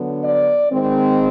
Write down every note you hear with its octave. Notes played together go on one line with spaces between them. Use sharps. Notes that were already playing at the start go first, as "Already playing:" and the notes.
Already playing: D3 F#3 B3
D5
D#3 G#3 C4